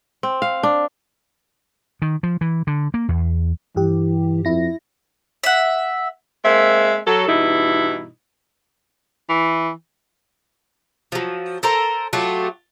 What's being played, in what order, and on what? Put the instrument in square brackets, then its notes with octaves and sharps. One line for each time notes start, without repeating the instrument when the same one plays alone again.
[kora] C4
F5
D4
[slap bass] D#3
F3
E3
D3
A#3
E2
[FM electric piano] G2 G4 [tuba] E3
[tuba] F2 [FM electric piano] E4 A#6
[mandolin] E5 F#5
[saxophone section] G#3 A#3 C4 E5
F#3 A4
G2 B2 E3 D#4 E4
[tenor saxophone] E3
[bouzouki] F3 F#3
A4 A#4 C5 A#5
F#3 A3 F4 G4